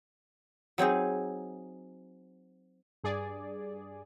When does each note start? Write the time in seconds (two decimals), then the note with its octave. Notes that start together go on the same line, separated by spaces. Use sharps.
0.78 F#3 C4 D#4 G#4
3.04 G2 G#4 D5